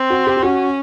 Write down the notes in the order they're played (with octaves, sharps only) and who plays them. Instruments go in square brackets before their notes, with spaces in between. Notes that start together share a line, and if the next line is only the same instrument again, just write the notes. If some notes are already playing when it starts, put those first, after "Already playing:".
Already playing: [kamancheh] C4
[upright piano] F#4
G4
G4
[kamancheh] C#4 [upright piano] F#4